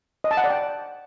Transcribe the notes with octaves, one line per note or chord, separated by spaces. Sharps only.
D#5
A5
F#5
D5
G5